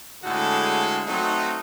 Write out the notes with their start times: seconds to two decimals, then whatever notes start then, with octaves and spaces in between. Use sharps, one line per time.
0.24 A2 D3 G#3 F#4 G#4 A4
1.07 F#3 A3 C4 D#4